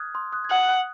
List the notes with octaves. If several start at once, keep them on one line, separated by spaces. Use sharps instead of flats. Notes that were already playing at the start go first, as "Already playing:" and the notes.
Already playing: D#6 F6 F#6 G#6
C6 D#6
D#6 F#6
G#6
F#5 D#6 F#6